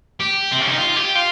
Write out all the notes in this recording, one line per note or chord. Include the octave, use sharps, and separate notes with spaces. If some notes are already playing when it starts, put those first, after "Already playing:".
G4
C4
C#4
D#4
F4
G4
F4